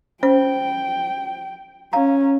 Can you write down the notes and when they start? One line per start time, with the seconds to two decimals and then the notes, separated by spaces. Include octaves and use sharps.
0.23 C#4 C5 G5
1.93 C#4 F5 A#5